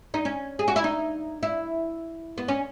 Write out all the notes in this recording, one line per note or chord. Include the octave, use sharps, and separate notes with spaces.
D#4
C#4
G#4
F#4
E4
D#4
E4
B3
C#4